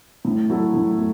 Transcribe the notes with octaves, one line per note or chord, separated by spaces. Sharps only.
A2
F#3 A3 E4 A4
A2
A3